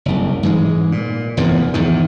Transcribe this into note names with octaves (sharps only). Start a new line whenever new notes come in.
F#1 C2
G#2 E3 G#3
A#2
F1 E2 G#2 F3
E2 G#2 D#3